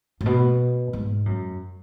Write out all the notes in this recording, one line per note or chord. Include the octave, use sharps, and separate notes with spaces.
A2
B2
G#2
F#2